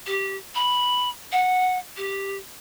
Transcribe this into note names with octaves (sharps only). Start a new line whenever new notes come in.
G4
B5
F#5
G4